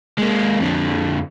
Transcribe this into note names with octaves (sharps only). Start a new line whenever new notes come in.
G#3 A#3
F2 D3